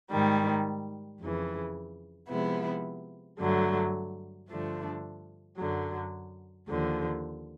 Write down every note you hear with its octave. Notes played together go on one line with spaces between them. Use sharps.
G#2 D#3 G3
F2 C#3 E3
C3 F3 G#3 B3 E4
G2 D3 F#3 A3
G2 D3 F3 A3 D4
F#2 D3 F#3
D#2 D3 F3